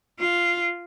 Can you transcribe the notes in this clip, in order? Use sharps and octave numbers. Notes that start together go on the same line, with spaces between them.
F4